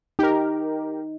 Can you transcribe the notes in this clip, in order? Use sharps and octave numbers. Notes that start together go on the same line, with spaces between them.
D#4 G4 A#4